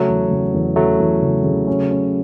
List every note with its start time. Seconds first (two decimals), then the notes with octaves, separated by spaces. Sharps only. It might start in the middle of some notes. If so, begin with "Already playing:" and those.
Already playing: C#3 F#3 A3
0.08 E2
0.31 C#3
0.54 E2
0.76 C#3 F#3 A3
1.00 E2
1.23 C#3
1.44 C#3
1.67 C#4
1.90 C#4